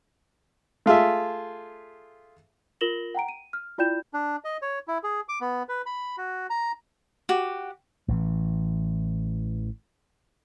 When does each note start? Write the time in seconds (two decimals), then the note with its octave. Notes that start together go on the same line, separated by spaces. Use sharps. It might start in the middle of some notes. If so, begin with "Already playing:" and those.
0.86 A3 F4 G#4 E5
2.81 F4 A#4 A#6 E7 F#7 G7
3.15 F#5 G5 A#5 D7
3.29 D#7
3.53 F6
3.78 E4 F4 D5 G5 G6 E7
4.13 D4
4.44 D#5
4.62 C#5
4.88 E4
5.04 G#4
5.29 D6
5.41 B3
5.69 B4
5.86 B5
6.17 F#4
6.50 A#5
7.29 F#4 G4
8.08 A1 E3